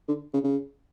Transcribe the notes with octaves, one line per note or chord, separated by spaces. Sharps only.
D3
C#3
C#3